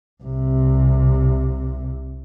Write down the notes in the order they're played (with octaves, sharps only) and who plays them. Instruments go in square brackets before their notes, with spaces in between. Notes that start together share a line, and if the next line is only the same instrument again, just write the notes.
[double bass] C2 C3